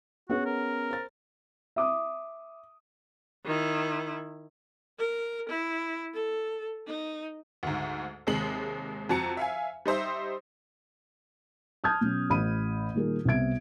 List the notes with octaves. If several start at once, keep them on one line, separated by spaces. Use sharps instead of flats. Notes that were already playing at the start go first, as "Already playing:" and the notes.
B3 C#4 F#4 G#4
A#4
C5 A6
E5 D6 D#6
D#3 E4
A#4
E4
A4
D#4
D2 G#2
D#2 C3 G#3 F#7
F2 F#4 A5 A#5 C#7
E5 F5 G#5
G3 D#4 C5 E5
A5 D#6 F6 G6 G#6
B2 F#3 C#4
A1 B5 D#7
A#2 D#3 G3 G#4 A#4
C2 B3 C4 E5 G#6 D7